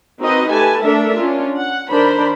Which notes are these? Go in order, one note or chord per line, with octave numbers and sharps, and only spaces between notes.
C4 D#4 F#4 A#4 B4 D#5
A3 G4 B4 G#5 A5
A3 D4 A4 A#4 E5
C#4 D4 F4
F#5
D#3 D4 A#4 C5 B5